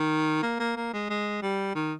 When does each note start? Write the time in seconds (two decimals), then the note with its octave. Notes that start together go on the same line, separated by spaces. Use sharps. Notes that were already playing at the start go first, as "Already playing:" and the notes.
Already playing: D#3
0.43 A#3
0.60 A#3
0.76 A#3
0.93 G#3
1.10 G#3
1.42 G3
1.75 D#3